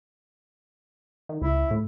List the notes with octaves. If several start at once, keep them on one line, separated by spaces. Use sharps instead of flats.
D#3
C#2 E4
A2